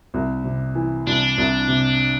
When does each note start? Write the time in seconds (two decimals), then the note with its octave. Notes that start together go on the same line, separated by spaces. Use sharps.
0.14 C2
0.44 C3
0.75 E3
1.07 C2 D4
1.38 C2
1.68 C3